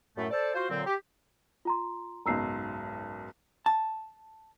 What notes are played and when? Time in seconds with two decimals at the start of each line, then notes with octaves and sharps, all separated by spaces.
0.16 F#2 A2 A3
0.31 A4 C5 D5 A5
0.54 F4 F#4 C5
0.70 A#2 D3 F#3 C4
0.86 G4
1.65 F4 A#5 C6
2.26 F#1 B1 G#2 A#5 E6 C7
3.66 A5